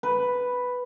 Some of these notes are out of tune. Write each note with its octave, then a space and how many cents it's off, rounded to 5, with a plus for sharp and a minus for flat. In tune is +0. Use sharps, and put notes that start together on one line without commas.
B4 +0